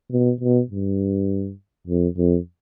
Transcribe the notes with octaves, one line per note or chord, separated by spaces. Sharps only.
B2
B2
G2
F2
F2